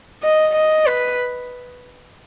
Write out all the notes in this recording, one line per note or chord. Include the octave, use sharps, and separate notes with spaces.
D#5
D#5
B4